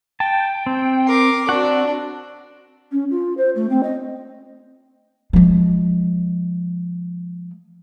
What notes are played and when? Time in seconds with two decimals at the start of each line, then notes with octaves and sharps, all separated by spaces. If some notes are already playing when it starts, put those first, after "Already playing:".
0.20 G5 A5
0.66 C4
1.07 A#4 D6 C7
1.49 C4 D4 F#4 F#5
2.91 C#4
3.10 F4
3.37 C5
3.56 A3
3.69 C4
3.83 D#5
5.33 F3 G#3